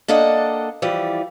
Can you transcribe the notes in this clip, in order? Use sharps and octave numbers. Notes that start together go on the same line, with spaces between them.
A#3 D4 A4 D#5 F#5
E3 F3 G3